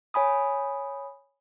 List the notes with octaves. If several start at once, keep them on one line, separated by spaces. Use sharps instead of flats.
C#5 G#5 B5 D#6